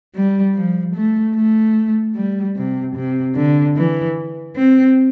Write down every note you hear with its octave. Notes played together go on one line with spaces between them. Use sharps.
G3
F3
A3
A3
G3
C3
C3
D3
E3
C4